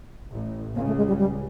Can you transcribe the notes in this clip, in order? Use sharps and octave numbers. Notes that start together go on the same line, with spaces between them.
A1 A2
C#2 C#3 A#3
A3
G#3
G3
G3